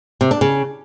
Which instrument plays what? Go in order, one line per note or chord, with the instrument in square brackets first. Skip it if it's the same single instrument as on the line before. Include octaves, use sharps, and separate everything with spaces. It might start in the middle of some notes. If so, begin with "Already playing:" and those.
[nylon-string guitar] C3
D4
C#3